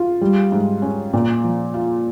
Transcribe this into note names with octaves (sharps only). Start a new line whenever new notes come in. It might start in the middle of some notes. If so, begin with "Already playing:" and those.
Already playing: F4
G3
G#2
C#4
A#2
F3
F4